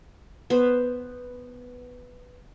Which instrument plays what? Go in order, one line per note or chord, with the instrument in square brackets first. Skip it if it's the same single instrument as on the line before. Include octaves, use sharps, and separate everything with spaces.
[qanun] B3 C5